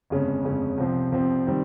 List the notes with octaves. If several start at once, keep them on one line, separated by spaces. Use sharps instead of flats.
G1 F2 C#3 G#3 C#4
G1 F2 C#3 G#3 C#4
C2 C3 F3 C4
C2 C3 F3 C4
D#3 G3 C4